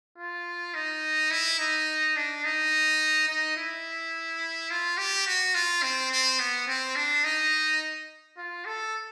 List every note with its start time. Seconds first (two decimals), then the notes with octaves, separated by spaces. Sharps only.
0.18 F4
0.74 D#4
1.31 E4
1.59 D#4
2.16 D4
2.44 D#4
3.28 D#4
3.57 E4
4.71 F4
4.98 G4
5.27 F#4
5.54 F4
5.82 C4
6.11 C4
6.39 B3
6.68 C4
6.96 D4
7.24 D#4
8.38 F4
8.65 A4